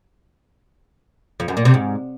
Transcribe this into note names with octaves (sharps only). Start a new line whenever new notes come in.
F2
F#2
A#2
C3
G#2